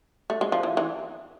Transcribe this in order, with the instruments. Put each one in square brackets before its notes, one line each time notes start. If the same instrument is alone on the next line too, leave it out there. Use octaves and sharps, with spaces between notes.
[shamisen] A3
G#3
F3
E3
E3